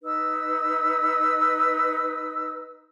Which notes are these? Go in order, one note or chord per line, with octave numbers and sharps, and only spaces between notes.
D#4 B4 E6